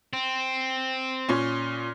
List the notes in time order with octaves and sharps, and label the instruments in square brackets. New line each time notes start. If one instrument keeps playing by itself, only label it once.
[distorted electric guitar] C4
[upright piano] A#2 C#4